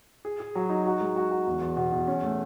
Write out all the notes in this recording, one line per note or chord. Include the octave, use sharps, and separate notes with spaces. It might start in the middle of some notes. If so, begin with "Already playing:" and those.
G#4
G#4
F#3
D#4
F#4
G#3
F#4
F#4
E2
E2
B2
E2
C#4
A3